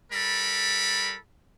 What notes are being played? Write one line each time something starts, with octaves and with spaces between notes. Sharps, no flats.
G3 A4 A#4 B5